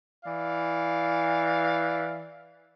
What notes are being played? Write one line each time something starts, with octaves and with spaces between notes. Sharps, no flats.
E3 D5 F5